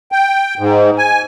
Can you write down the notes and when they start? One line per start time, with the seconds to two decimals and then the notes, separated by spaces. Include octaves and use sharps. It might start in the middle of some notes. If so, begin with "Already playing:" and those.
0.12 G5
0.59 G#2
0.98 G#5